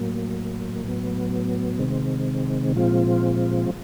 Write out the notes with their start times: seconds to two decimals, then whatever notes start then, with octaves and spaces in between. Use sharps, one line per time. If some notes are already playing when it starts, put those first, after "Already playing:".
Already playing: A2 F#3 A#3
0.83 A2 F#3 B3
1.79 C3 D#3 G#3 C4
2.75 A#2 F3 G#3 C4 F4